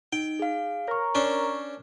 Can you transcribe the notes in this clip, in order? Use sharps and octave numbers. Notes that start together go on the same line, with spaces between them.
D#4 G5
G#4 F5
A#4 C#5 C#6
C#4 D4 C5